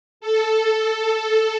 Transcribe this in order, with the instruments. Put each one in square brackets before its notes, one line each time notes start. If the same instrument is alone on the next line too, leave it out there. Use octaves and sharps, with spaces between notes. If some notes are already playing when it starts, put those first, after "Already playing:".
[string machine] A4